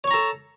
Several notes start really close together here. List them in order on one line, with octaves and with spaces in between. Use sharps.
C#5 C#6 A#5 A4